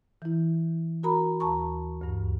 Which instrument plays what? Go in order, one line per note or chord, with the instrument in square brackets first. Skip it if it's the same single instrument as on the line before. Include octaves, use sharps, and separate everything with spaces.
[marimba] E3 E4
F#4 A#4 A#5 B5
D#2 A5 A#5 C#6
D2 G2